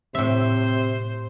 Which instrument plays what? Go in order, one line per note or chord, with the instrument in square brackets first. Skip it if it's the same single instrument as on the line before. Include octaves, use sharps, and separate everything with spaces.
[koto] A2 E5 [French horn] C3 [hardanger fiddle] C5